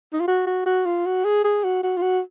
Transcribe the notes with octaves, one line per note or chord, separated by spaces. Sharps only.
D#4
F4
F#4
F#4
F#4
F4
F#4
G#4
G#4
F#4
F#4
F4
F#4